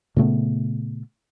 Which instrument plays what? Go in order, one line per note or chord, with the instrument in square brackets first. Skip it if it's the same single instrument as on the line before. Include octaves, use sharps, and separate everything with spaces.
[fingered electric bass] A#2 C#3 A3 B3